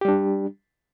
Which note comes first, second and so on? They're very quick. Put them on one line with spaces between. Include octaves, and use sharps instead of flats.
G4 G3 D4